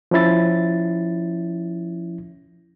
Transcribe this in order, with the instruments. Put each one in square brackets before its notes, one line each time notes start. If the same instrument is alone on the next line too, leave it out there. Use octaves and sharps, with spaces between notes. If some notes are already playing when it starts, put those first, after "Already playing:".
[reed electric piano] F3 C#4 E4 A6